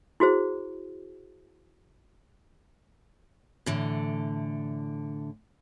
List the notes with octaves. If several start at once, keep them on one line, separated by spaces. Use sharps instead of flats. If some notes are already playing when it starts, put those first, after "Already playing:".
E4 F#4 G#4 C5
A2 D3 E3